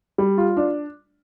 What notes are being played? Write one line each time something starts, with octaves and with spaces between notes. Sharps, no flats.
G3
F4
D4